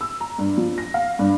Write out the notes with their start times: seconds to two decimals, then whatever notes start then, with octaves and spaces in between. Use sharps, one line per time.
0.01 E6
0.20 A#5
0.38 G2
0.58 F3
0.78 A#6
0.94 F5
1.19 G2